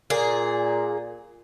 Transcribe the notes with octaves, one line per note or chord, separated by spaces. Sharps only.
A#2 G#4